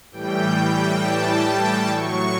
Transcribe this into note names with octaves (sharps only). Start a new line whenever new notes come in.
A2 E3 G3 G5
A5
A2 F#3 C#6